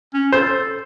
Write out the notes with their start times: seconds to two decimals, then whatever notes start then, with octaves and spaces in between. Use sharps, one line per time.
0.14 C#4
0.32 A4 C5